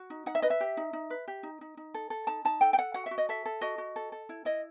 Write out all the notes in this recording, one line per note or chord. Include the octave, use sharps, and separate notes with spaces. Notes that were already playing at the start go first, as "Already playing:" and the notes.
Already playing: F#4
D#4
D#4 F#5
E5
B4 D#5
E5
G4
D#4
D#4
B4
G4
D#4
D#4
D#4
A4
A4
D#4 A5
D#4 A5
A4 G5
G5
A4 F#5
F#4 F#5
E5
F#4
D#5
A4 E5
A4
F#4 D#5
F#4
A4
A4
E4
E4 D#5